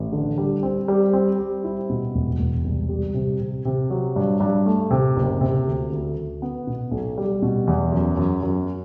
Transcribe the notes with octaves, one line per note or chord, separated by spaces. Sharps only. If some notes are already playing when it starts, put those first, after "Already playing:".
Already playing: A1
D3
G3
C4
G3
C4
G3
E4
B2
E1
E1
C2
G3
C3
C3
C3
F#3
G2
G2
A3
C3
F#1
C3
D2
D2
D2
B3
B2
B1
G3
B2
E2
F#2
F#2
F#2